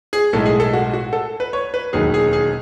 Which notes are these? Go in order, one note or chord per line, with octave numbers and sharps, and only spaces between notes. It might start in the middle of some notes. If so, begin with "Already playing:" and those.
G#4
B1 A2 G#3 A4
G#4
A4
F#4
F#4
A4
B4
C#5
B4
E1 D#2 D#3 F#3 G#4
G#4
G#4